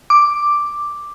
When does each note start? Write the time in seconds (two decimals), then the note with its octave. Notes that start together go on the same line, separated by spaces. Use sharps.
0.10 D6